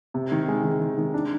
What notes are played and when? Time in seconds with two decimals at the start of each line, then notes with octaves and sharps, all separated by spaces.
0.14 C3
0.32 D#3
0.48 G#3
0.64 D#3
0.80 D#3
0.98 D#3
1.14 D4